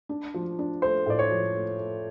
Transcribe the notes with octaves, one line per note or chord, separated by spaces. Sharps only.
D4
F3
D4
A3 C5
A2 D5
C#5
F3
A3
A3